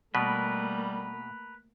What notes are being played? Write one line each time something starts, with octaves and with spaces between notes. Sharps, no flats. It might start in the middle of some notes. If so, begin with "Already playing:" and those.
B2 G3 A3 A#3 A#4 B4